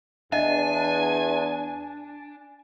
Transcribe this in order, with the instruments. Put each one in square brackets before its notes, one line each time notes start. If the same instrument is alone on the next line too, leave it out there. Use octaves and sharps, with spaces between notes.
[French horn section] E2 [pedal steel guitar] D4 [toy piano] D#5 E5 [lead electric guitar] G#5